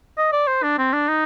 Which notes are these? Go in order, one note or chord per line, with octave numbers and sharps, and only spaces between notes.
D#5
D5
C5
D4
C4
D4
D#4